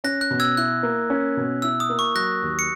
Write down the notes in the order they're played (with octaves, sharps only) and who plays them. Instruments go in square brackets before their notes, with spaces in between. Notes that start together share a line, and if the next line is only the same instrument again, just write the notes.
[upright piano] C#4 [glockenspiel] F#6 A#6
[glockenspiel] F#6
[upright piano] B2
[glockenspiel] E6 G#6
[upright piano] E4 [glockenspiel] F#6
[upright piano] A#3
C#4
B2
[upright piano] E4 [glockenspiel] E6
[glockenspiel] D#6
[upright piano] A#3
[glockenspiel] C#6
[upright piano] F#3 [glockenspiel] F#6 A#6
[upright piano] D#2
[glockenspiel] C#7